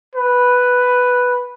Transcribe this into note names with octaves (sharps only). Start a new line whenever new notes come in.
B4